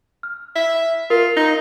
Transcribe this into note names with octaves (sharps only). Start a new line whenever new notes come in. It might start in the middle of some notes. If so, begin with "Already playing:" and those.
F6
E5
F4 A#4
D#4